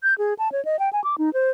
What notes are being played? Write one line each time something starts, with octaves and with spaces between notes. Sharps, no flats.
G6
G#4
A5
C#5
D#5
G5
G#5
D6
D#4
C5